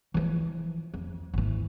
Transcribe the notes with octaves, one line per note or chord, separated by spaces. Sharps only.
E3 F3
F2
G#1 E3